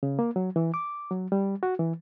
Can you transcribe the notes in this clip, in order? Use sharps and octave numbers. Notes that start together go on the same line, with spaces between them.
C#3
A#3
F#3
E3
D6
F#3
G3
F#4
E3